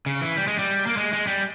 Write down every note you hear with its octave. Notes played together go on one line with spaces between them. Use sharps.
C#3
E3
G3
G#3
G3
A#3
G#3
G#3
G3